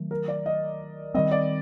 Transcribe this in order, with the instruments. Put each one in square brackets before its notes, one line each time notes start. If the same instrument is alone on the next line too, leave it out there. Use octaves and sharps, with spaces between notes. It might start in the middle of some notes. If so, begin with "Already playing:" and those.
Already playing: [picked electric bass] D#3 F#3 A3
[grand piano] A#4
D5
D#5
[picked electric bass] D#3 G3 C4 [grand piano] D#5
[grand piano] D5